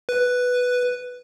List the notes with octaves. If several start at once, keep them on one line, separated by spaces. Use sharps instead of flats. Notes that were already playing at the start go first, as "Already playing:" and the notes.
B4